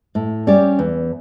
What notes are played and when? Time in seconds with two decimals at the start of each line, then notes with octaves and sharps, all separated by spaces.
0.15 A2
0.47 G3 C#4 G4 D5
0.79 E2